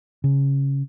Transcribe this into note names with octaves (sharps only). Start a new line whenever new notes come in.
C#3